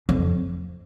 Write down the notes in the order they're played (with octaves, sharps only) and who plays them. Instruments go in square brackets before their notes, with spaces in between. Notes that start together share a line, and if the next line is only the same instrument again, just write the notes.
[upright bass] F2